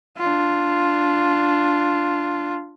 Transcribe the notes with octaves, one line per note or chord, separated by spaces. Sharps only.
D4 F4